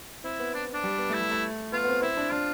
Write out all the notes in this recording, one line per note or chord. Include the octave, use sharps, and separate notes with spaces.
C4 E4
B3
D4
D4
G3
B3
A3 E4
G3
A3
B3 F4
B3
C4
C4 E4
D4
D4 F4